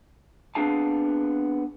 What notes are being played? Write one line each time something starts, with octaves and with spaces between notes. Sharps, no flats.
B3 C4 D4 G#4 F5 A5